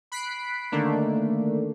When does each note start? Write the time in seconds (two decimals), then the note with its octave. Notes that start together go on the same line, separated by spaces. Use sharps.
0.12 B5 F#6 B6 C7 D7
0.72 D3 D#3 A3 A#3 D4